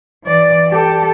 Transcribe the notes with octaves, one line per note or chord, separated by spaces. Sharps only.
E3 D5
G4 A4